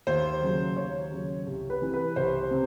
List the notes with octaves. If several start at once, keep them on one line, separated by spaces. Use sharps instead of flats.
D#2 C5
C#3 F#3
D#2 C#5
C#3 F#3
C2
B4
C3 E3
B4
C2 C5
C3